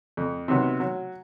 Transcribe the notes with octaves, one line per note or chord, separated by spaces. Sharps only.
F2
C3 D#3 F#3 B3
F#3